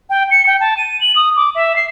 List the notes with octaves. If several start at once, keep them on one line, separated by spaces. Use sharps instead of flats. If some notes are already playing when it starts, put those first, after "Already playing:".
G5
C#7
G5
A5
D#7
F#7
D#6
D6
E5
C7